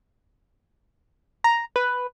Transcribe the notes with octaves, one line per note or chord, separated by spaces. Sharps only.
A#5
B4